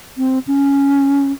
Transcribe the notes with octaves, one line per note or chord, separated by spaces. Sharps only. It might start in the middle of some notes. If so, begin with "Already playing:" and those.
C4
C#4